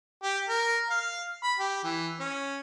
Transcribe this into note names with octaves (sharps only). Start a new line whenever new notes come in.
G4
A#4
F5
B5
G4
E3
C#4